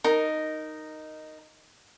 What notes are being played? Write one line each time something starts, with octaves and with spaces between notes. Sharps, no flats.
D#4 A#4